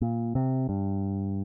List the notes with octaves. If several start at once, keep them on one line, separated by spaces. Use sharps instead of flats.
A#2
C3
G2